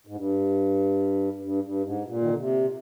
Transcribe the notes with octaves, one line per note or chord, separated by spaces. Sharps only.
G#2
G2
G2
G2
G#2
A#2
D#3
D3
C3